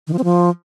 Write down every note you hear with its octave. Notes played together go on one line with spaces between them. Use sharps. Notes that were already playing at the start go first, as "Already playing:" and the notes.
D#3
F3
C4
F3